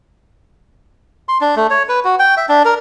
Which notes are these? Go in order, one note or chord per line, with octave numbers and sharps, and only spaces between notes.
C6
D4
A3
C#5
B4
F#4
G5
E5
D4
A#4